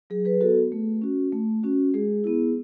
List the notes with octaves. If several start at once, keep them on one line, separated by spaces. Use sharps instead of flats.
F#3 G#4
G#4 B4
B3 F#4 A4
A3
C#4 F#4
A3
C#4 F#4
G#3 G#4
B3 E4